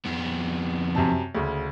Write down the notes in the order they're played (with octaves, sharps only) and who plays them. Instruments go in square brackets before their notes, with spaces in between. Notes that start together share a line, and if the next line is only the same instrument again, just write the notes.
[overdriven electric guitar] F2 B3
[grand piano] F#2 C3 A5
D2 C#3